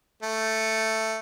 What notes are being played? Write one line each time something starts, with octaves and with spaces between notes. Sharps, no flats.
A3